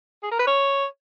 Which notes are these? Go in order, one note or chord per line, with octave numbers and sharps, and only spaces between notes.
G#4
A#4
B4
C#5